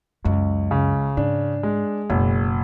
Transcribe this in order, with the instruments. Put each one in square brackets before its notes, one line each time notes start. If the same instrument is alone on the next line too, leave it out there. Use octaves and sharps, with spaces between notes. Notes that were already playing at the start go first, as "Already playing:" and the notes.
[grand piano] C#2 [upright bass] F#2
[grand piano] C#3
[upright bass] G#2 [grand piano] D4
[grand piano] G#3
[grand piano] F#1 [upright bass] B2